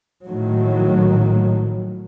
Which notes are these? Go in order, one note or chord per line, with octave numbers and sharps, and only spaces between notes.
A#1 A2 D#3 F#3